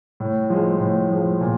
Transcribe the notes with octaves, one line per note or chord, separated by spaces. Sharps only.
A2
F3 G#3
A2
F3 G#3
A#2